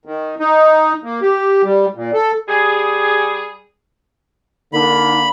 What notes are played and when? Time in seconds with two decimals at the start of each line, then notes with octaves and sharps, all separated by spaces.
0.05 D#3
0.39 D#4
1.04 A#3
1.22 G4
1.64 G3
1.95 A#2
2.14 A4
2.49 G3 G#4
4.73 D3 A#3 D#4 B5